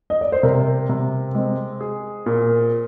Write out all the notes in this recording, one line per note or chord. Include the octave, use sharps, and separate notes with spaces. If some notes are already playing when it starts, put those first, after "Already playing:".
D#5
D5
C5
C3 A#4
C3
G#3 C4
G#4
A#2